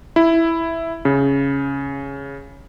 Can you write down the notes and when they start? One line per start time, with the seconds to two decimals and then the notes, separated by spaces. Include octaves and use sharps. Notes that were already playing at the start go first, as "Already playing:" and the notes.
0.16 E4
1.05 C#3